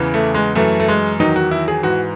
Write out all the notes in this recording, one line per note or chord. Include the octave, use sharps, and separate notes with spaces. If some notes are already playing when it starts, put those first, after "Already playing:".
Already playing: E2 C#3 E3
A3
G#3
F#2 E3 A3
A3
G#3
E2 D#3 F#3 D#4
F#4
E4
G#4
G#2 E3 F#4